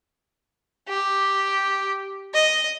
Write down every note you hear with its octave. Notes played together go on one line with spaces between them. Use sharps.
G4
D#5